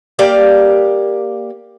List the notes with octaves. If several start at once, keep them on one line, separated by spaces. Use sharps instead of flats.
A#3 G4 D5 F5